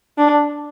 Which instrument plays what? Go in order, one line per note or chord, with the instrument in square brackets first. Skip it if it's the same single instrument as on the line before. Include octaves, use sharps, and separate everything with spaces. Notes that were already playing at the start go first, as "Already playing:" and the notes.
[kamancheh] D4